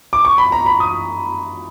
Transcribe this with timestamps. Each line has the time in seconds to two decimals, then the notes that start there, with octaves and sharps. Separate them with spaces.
0.13 D6
0.25 C#6
0.38 B5
0.52 A#5
0.66 B5
0.80 D#6